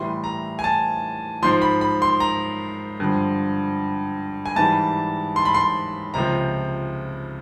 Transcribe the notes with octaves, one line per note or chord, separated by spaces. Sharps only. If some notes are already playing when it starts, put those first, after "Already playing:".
Already playing: A2 E3 G3 C6
A#5
G#5
A5
G#2 F3 C6
B5
B5
C6
A#5
G2 D3 F3
G#5
G#2 E3 G3 A5
C6
B5
C6
C#2 C3 F3 A#5